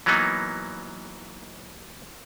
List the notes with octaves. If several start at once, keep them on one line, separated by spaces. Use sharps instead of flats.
E3 F#3 A#3 B3 D#4